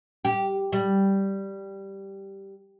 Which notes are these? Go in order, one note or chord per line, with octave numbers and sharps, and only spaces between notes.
G4
G3